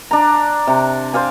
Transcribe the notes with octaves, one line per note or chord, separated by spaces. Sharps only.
D4 A#5
C3
C5 D5 F5 G#5